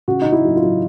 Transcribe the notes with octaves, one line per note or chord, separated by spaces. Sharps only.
C#3 F#4
C#3 D#4
E4
F#3
F4
F#3